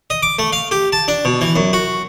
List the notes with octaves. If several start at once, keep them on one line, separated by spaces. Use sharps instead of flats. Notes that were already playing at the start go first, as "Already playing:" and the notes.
D#5
D6
A3
F5
G4
A5
D4
B2
E3
F#2
F#4